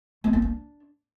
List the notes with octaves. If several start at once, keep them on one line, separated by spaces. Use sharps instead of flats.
A3
A#3
D4